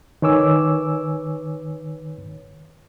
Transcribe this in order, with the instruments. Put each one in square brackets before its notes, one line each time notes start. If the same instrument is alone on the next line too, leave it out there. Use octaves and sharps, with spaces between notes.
[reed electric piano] D#3 B4 C#5 G#5 D6 E6